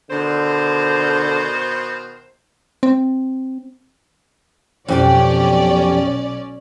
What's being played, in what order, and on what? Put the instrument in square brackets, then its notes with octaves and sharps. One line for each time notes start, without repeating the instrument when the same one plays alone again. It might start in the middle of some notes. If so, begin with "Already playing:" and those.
[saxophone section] B2 D#3 C5 [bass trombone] D3
[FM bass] C4
[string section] B1 C#4 D5 [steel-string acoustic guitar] F2 G4 G5